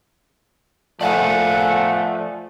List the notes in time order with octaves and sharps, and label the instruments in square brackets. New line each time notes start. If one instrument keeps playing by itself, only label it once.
[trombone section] F3 A3 [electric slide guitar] D5 F5 G#5 [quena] F#5